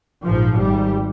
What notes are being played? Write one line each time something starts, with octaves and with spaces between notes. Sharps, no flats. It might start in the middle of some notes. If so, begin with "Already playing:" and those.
A#1 G#2 F3
G#1 G#2 G3